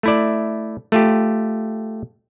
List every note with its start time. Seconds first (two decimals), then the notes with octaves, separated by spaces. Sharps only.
0.03 A3 E4 D5
0.92 A3 F4 G4